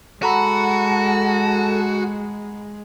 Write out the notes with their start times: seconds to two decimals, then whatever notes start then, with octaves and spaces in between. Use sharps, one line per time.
0.23 G#3 F#4 A4 F#5 A#5 B5